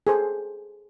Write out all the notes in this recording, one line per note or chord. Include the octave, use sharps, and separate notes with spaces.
G#4 A4 C5